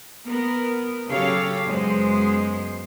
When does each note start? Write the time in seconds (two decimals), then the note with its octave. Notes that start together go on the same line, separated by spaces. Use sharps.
0.26 B3 A#4
1.09 C#3 F#3 G4 A4 C#5 F5
1.65 F#2 C#3 G#3 B3 C5